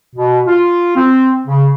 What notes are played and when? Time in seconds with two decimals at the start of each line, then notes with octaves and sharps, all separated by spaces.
0.16 B2
0.47 F4
0.96 C4
1.47 C#3